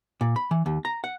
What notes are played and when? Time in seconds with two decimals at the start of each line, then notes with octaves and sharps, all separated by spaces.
0.21 A#2
0.36 B5
0.51 E3
0.66 D#2
0.85 A#5
1.04 F#5